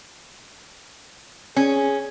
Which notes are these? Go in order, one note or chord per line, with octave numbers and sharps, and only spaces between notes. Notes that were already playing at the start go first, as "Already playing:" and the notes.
C#4 G#4